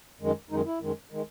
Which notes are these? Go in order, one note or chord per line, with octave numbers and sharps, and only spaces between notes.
F#2 D#3 G#3
F#2 D#3 G#3 D#4
E4
F#2 D#3 G#3
D#3 G#3